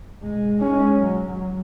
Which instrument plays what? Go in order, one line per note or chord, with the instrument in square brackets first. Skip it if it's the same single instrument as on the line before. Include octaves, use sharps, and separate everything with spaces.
[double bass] G#3
[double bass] G#3 [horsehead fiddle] C#4
[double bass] F#3